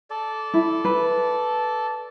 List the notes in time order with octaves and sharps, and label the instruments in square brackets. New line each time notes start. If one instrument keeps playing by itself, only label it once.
[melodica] A4 D5
[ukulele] E4
B4